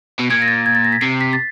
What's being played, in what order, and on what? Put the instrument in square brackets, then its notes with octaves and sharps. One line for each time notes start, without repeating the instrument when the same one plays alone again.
[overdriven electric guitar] B2
[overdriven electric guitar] A#2 [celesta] G#6
[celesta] A#6
A6
G#6
A6
A#6
B6
[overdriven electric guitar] C3 [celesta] C7
[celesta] B6
A6